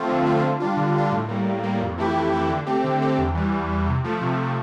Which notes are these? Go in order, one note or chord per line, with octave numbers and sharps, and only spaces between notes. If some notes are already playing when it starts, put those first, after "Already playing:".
Already playing: F3 A3 C4 F4
D3
F3 A3 C4 F4
D3
G3 D4 F4
D3
G3 D4 F4
A2
G3 A#3
A2
G3 A#3
F2
E3 A3 E4 G4
F2
E3 A3 E4 G4
D3
A3 C4 G4
D3
A3 C4 G4
E2
E3 G3
E2
E3 G3
C3
F3 A3
C3
F3 A3